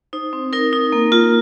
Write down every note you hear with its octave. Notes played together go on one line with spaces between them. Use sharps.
D#4 C5
C4
D#4 A#4
D#4
A#3 A#4
F4